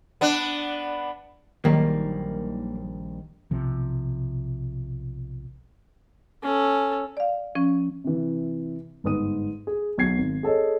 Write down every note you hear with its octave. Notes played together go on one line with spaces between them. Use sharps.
B3 D4
A#1 D#3 F#3 G3 A#3
B1 C3 F3
C#4 A4
D5 F5
F3 C#4
C3 E3
G1 G#2 B4 D#6 D#7
G#4
B1 F#3 G#6 C7
G#1
G#4 A4 C#5 D#5